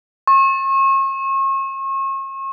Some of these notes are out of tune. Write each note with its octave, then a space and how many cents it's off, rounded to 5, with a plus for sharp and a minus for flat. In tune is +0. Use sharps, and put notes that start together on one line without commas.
C#6 -40